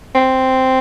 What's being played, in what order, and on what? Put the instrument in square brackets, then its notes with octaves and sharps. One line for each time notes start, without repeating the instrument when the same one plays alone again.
[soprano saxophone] C4